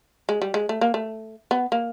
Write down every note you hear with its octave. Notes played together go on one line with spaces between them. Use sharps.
G#3
G3
G#3
A3
A#3
A3
B3
A#3